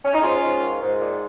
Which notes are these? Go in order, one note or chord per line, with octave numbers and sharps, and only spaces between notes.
C#4
D#4
G#2 C#4 F4
G#2
D#3
G#2
A#2